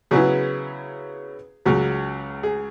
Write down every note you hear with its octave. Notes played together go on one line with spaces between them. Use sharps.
C#3 F#3 B3 E4 G#4
C#2 C#3 F#3
G#4